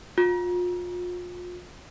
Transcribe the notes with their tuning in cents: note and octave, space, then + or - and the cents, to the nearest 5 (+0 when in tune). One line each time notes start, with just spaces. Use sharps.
F4 +35